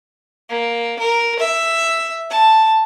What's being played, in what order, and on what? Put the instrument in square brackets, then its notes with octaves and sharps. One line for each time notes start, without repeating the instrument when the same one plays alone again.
[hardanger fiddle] A#3
A#4
E5
A5